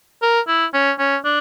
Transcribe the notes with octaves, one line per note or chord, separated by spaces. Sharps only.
A#4
E4
C#4
C#4
D4